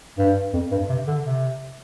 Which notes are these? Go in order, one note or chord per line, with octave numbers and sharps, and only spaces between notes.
G2
F2
G2
C3
D3
C3